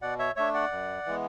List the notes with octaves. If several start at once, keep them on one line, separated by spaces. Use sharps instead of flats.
B2 D5 F#5
C#5 E5
A3 D4 C#5 E5
D5 F#5
F#2
E3 G#3 B3